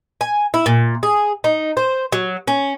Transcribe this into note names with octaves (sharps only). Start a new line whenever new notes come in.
G#5
E4
A#2
G#4
D#4
C5
F#3
C#4